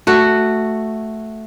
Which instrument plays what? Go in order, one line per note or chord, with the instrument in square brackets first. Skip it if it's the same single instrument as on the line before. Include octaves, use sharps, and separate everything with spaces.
[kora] A3 F#4